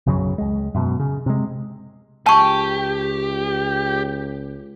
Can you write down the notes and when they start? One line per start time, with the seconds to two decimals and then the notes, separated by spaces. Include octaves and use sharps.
0.06 B1 F#2 C#3 F#3
0.38 C#2 G#3
0.75 F#2 B2
1.00 C#3
1.26 C3 G#3
2.26 C#2 G4 A5 C#6